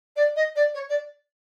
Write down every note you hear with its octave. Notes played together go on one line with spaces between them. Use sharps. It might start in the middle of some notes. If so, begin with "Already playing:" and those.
D5
D#5
D5
C#5
D5